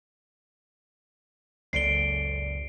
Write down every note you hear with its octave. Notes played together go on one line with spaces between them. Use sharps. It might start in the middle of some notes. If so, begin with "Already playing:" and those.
F#1 C#2 A4 D5 C7 D7 G7